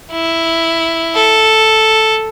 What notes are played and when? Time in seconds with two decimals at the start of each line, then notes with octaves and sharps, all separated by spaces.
0.12 E4
1.15 A4